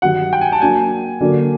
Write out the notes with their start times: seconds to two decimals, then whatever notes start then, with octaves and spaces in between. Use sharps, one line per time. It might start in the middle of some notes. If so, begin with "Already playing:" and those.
0.02 G2 D#3 F#3 F#5
0.33 G5
0.41 G#5
0.52 A5
0.62 F#3 A#3 D4 G#5
1.21 D3 F#3 A#3 D4